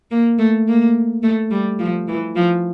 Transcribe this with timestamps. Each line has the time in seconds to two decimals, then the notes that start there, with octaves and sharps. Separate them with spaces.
0.11 A#3
0.39 A3
0.68 A#3
1.23 A3
1.51 G3
1.79 F3
2.08 E3
2.36 F3